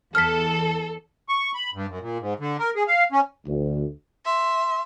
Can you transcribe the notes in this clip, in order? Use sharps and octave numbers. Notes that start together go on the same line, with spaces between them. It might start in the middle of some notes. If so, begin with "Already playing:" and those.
E2 A4 A5 F6 B6
C#6
B5
G2
F#2
A#2
G#2
D3
A#4
G#4
F5
C#4
D2
E5 C6